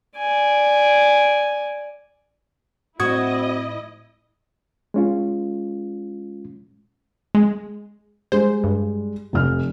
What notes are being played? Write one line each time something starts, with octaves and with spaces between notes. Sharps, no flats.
D5 G#5
A2 C4 E4 F#4 D#5 D#6 G#6
G#3 C#4 F4
G#3
G3 G#3 C5
G2
F1 F6